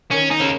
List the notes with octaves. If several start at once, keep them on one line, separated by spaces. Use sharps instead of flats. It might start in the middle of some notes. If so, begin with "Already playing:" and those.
D#3 C#4
D#4
C#3 A#3